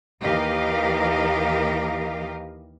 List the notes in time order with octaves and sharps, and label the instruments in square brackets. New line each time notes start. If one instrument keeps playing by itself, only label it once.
[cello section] D#2 E3 G4 A#4 D#5 F5